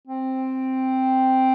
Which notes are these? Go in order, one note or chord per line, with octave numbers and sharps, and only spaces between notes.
C4